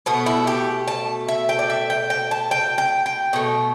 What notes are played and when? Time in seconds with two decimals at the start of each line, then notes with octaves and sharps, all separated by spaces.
0.06 B2 A3 B3
0.26 E4
0.47 G4
0.88 A5
1.28 E5
1.49 G5
1.59 D5
1.70 E5
1.90 G5
2.10 G5
2.31 A5
2.51 G5
2.78 G5
3.06 G5
3.33 B2 A3